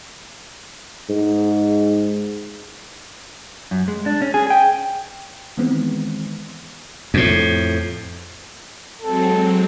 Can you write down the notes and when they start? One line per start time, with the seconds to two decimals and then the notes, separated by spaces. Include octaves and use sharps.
1.09 G#2
3.71 F#2
3.88 G#3
4.06 D4
4.22 C#4
4.34 G#4
4.50 G5
5.57 D#3 E3 G#3 B3 C4
7.14 F2 A2
9.02 F#3 G#3 C4 A4